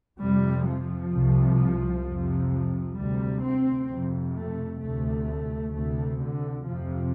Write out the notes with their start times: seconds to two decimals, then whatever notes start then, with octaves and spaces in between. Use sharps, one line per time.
0.19 F2 C3 G3
0.66 F3
1.12 C2 C3
2.04 F2 C3
2.49 F3
2.95 D2 C3 G3
3.41 C4
3.86 F2 C3
4.33 A3
4.78 D2 C3 A3
5.71 D2 C3 A3
6.16 D3
6.62 F2 C3 F3